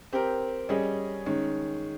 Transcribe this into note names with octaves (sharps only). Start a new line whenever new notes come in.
C4 G4 A#4
G3 C#4 G#4 D#5
D#3 G#3 C#4